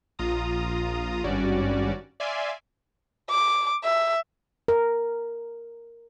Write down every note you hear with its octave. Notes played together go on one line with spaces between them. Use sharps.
A#1 F4 A#5 D#6
G#1 G2 G3 C#4 F#4 D5
D5 E5 F5 G#5 C6
D6
E5
A#4